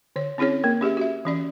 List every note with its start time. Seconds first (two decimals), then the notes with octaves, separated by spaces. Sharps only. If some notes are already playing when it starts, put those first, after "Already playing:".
0.16 D3 C#5
0.38 C4 C#4 E4 G#4 C#5
0.64 A#3 A#4
0.81 C#4 G4 G#4 E5
0.97 F#4 E5
1.25 E3 C#4 D5